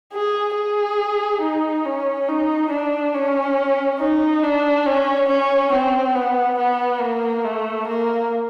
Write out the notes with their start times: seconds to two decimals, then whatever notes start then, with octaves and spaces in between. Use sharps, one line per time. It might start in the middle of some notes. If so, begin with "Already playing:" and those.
0.13 G#4
0.55 G#4
1.41 D#4
1.85 C#4
2.28 D#4
2.70 D4
3.14 C#4
3.99 D#4
4.43 D4
4.86 C#4
5.29 C#4
5.73 C4
6.15 B3
6.58 B3
7.01 A#3
7.44 A3
7.88 A#3